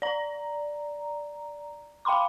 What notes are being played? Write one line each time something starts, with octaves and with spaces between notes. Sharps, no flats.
D5 A#5
F5 G5 B5 C6 D6